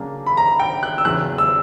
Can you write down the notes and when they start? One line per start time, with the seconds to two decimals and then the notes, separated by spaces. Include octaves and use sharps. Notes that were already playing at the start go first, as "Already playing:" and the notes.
Already playing: C#3 F#3 A#3 D4
0.26 B5
0.37 A#5
0.60 G5
0.83 F#6
0.98 E6
1.05 E2 C#3 F#3 F#6
1.38 E6